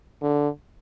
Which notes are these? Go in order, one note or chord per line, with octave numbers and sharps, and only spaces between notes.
D3